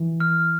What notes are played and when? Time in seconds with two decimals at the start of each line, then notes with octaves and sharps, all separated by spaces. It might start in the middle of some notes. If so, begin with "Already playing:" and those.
Already playing: E3
0.20 F6